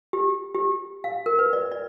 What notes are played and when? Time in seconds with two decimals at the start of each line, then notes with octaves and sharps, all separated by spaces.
0.13 G4
0.55 G4
1.04 F5
1.26 A#4
1.39 B4
1.53 D5
1.71 D5